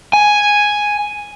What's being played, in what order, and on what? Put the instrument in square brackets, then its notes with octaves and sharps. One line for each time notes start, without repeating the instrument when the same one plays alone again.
[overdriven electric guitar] G#5